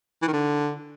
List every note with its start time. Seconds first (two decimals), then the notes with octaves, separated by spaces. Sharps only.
0.22 E3
0.27 D#3
0.33 D3